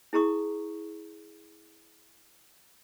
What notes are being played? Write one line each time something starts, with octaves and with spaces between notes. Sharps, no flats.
E4 G#4 A#5 C#6 D#6